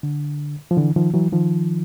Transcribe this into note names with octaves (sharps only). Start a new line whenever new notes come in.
D3
F3
D3 E3
D#3 F3
E3 F#3
D#3 F3